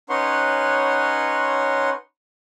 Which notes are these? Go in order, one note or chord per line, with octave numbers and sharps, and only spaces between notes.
C#4 D#4 B4 C#5 F#5 C6